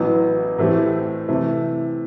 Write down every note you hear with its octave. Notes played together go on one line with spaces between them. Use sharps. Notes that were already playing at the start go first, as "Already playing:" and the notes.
Already playing: A1 A2 F#3 B3
A2 E3 A3 C4 G4
C3 E3 A3